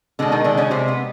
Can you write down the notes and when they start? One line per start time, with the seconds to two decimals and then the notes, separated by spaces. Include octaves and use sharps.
0.19 B2 D3 G#3 D4
0.32 D#3 D#4
0.44 D3 D4
0.57 C#3 C#4
0.71 C3 C4
0.88 B3